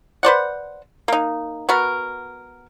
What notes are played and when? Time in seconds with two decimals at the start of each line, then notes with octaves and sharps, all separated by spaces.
0.23 B4 C5 D5 F#5
1.08 A#3 D#4
1.69 B3 F#4 A#4